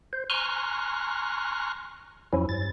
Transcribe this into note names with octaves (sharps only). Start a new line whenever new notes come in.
C5
G#5 A#5 C6 C#6 F6 F#6
F2 F3 F#3 C#4 E4
G2 A6